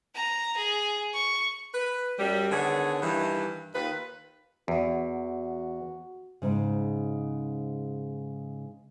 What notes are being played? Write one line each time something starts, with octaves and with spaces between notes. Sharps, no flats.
A#5
G#4
C#6
B4
F#2 G3
D3 D#3 B3 G#4 C#5
G2 D#3 E3
D#2 F4 B4
E2 F#4
G#2 C#3